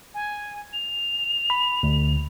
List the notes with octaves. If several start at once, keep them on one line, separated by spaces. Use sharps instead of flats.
G#5
F7
B5
D2